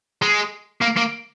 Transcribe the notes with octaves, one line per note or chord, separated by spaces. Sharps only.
G#3
A#3
A#3